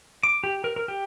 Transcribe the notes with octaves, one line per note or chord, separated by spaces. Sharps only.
D6
G4
A#4
A#4
G4